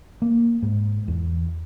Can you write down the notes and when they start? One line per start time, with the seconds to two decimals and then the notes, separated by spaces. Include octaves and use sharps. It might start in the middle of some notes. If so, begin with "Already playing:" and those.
0.22 A#3
0.62 G#2
1.08 E2